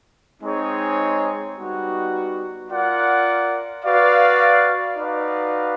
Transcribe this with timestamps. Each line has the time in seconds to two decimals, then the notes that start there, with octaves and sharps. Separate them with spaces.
0.42 G#3 C4 D#4 G#4 C#5
1.56 G3 B3 D#4 F#4
2.70 F4 A#4 D5 F#5
3.83 F#4 B4 D5 F5
4.97 D#4 F#4 B4 D5 F5